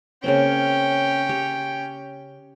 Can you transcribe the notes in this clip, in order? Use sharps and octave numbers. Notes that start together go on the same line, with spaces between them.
C#3 A#3 C4 C#4 G5
G4 C#5